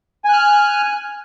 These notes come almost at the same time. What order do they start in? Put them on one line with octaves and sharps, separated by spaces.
G#5 F#6 F6